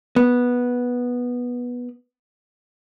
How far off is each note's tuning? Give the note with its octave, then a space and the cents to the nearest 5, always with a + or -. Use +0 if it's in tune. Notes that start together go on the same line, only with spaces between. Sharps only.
B3 -10